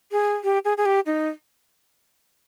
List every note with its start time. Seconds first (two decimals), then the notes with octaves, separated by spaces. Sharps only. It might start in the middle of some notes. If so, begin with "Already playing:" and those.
0.12 G#4
0.44 G4
0.65 G#4
0.78 G#4
0.85 G4
1.06 D#4